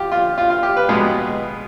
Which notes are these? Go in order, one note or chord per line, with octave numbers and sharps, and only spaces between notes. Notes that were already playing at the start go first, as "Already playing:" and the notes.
Already playing: F4 G4
F4
F4
F4
G4
B4
B2 G#3 B3